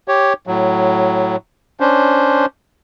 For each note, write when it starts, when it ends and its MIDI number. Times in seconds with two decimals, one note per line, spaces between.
0.08 0.33 67
0.08 0.33 73
0.47 1.36 45
0.47 1.36 54
1.80 2.46 61
1.80 2.46 62
1.80 2.46 72